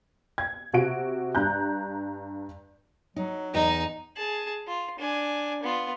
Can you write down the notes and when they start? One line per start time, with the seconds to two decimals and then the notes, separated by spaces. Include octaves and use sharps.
0.38 G#6
0.73 C3 F#4 D7
1.35 G2 A#5 F#6 G6
3.16 F#3 D#4
3.54 E2 D#4 D#5
4.16 G#4 A5
4.67 F4
4.99 D4 G#5
5.62 B3 F4